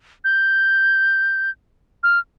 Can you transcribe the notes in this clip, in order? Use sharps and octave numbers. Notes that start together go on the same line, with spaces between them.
G6
F6